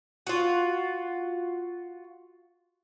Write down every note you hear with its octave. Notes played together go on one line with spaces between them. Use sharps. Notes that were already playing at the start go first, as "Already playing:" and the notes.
F4 F#4